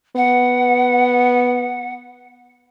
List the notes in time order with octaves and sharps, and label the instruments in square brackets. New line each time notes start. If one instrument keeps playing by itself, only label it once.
[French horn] B3 [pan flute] F#5